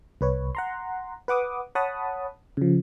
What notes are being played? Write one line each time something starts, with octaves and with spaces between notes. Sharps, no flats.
C2 B4 C#5
F#5 A#5 C6
B4 F#5 D6 D#6
C#5 F#5 A5 B5 D#6
C#3 F3